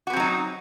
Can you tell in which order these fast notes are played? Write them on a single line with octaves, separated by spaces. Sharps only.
F#4 B3 C4 F#3 D#4